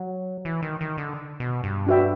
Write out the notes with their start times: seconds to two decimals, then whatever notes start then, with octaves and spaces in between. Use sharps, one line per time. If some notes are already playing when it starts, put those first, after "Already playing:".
Already playing: F#3
0.45 E3
0.62 D#3
0.81 D#3
0.98 D3
1.40 B2
1.64 G2
1.87 D4 F#4 B4 E5 G5